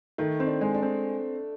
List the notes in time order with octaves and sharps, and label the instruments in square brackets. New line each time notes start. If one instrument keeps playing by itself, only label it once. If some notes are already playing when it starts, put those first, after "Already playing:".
[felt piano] D#3 [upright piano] A3
[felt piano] C4
[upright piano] D4
[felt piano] G#3
[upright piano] D4
[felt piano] C4